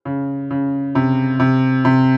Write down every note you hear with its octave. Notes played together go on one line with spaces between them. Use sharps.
C#3
C#3
C3
C3
C3